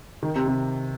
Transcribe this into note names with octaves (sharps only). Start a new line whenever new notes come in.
D#3
C3
C3